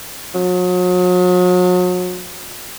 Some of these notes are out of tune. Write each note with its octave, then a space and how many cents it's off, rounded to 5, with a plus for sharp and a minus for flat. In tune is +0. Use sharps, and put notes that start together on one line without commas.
F#3 -40